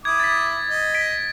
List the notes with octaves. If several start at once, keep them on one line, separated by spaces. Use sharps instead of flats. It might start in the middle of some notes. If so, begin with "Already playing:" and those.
E4 D6 D#6 G#6
A6 B6
D#5
B6 D7